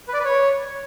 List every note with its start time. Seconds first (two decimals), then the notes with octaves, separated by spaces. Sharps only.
0.08 B4
0.14 D5
0.19 B4
0.25 C#5